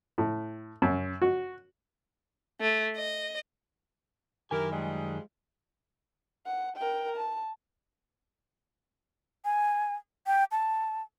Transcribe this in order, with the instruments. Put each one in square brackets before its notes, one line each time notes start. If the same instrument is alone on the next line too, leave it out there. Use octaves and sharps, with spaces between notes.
[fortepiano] A2
F#2
F#4
[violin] A3
D#5
[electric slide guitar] F#2 D#3 G#5 [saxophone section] E4 G4 A#4
[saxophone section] F3 G3 G#3
[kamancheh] F#5
A#4 G5
A5
[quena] G#5
G5
A5